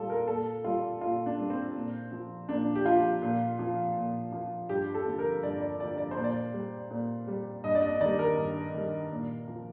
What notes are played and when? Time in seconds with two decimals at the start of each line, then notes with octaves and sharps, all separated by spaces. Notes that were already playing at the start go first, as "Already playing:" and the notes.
Already playing: A#2 G3 F4 A4
0.10 A#4
0.28 A#2 A4
0.64 G3 F4
1.01 A#2 F4
1.26 D4
1.38 G3
1.50 C4
1.74 A#2
2.12 F3
2.49 A#2 D4
2.75 G4
2.85 F3 F4
3.22 A#2
3.59 F3
3.96 A#2
4.32 F3
4.69 G2 G4
4.94 A4
5.06 D3 F3
5.19 A#4
5.43 G2 D5
5.61 D5
5.80 D3 F3 D5
5.98 D5
6.11 C5
6.17 A#2
6.24 D5
6.54 G3
6.91 A#2
7.27 G3
7.64 G2 D#5
7.75 D5
7.82 D#5
8.00 D#3 G3 D5
8.19 A#4
8.38 G2
8.74 D#3 G3
9.11 A#2
9.48 F3